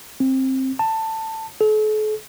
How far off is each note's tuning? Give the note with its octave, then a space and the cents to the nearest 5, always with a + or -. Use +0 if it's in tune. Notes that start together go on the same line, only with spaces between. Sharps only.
C4 +15
A5 +15
A4 -45